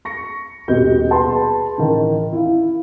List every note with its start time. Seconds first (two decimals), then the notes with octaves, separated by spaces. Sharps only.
0.05 C#6 A#6 C#7
0.68 D#1 B2 G4 D#5 G6
1.10 G#4 B4 A5 B5 C6
1.78 A1 D#3
2.32 E4 F5